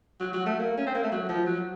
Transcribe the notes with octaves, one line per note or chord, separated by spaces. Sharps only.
F#3
F#3
A3
A#3
C#4
C4
A#3
A3
F#3
F3
F#3